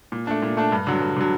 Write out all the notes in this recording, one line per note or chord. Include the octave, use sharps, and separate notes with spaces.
A#2
A3 D4
A#2
A3 D4
G2
D3 F#3
G2
D3 F#3